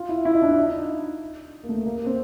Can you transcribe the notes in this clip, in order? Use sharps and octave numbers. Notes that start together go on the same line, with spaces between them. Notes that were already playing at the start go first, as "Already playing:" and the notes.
Already playing: F4
E4
E4
D#4
D4
D#4
A#3
A3
A#3
A#3
C4